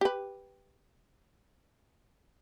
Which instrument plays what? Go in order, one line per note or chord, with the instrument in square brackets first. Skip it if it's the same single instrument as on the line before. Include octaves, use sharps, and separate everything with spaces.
[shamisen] G4 B4